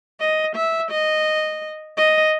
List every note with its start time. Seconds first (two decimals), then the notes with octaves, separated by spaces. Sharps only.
0.20 D#5
0.56 E5
0.91 D#5
1.97 D#5